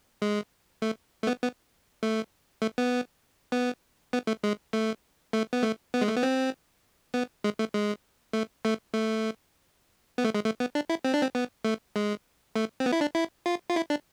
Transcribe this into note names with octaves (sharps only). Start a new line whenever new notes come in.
G#3
A3
A3
B3
B3
A3
A3
B3
B3
B3
A3
G#3
A3
A3
B3
A3
B3
G#3
A3
B3
C4
B3
G#3
A3
G#3
A3
A3
A3
B3
A3
G#3
A3
B3
D4
E4
C4
D4
C4
B3
A3
G#3
A3
C4
B3
E4
D4
E4
F4
F4
E4
D4